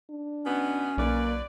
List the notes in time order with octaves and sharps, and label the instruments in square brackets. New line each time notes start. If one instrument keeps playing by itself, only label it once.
[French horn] D4
[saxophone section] B2 E3 B3 [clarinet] C#4
[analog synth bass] B1 [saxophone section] F#2 B4 D5 [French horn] A#3